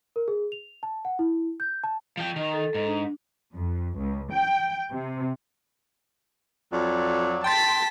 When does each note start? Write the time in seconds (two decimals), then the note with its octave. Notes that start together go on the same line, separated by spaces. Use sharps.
0.16 A#4
0.28 G#4
0.52 F7
0.83 A5
1.05 F#5
1.19 E4
1.60 G6
1.84 A5
2.17 F3 G5
2.36 D#3
2.53 A4
2.74 G#2
2.86 D4
3.53 F2
3.97 C#2
4.32 G5
4.92 C3
6.73 F2 F#3 D5
7.44 G5 A5 C6 A6 B6